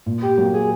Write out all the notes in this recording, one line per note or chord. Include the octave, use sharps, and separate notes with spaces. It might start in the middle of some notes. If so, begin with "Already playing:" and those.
A#2
G4
F#3 A#3
G#4